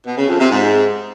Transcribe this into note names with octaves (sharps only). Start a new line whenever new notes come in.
B2
C#3
F2
C3
G#2